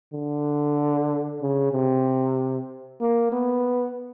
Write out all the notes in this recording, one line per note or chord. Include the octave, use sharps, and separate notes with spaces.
D3
C#3
C3
A#3
B3